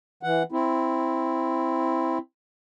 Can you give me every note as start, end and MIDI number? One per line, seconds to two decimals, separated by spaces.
0.23 0.43 52
0.23 0.43 78
0.52 2.18 60
0.52 2.18 64